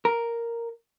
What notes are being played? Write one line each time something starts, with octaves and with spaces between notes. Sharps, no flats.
A#4